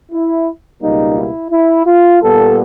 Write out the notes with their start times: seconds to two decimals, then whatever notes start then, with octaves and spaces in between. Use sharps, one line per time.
0.12 E4
0.81 C#2 B2 G3 A#3 D#4
1.17 E4
1.51 E4
1.86 F4
2.22 A#2 G3 B3 A4